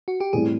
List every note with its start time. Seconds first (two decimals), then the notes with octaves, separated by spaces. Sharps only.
0.08 F#4
0.20 G4
0.33 A2 E3 G3 C4 G#4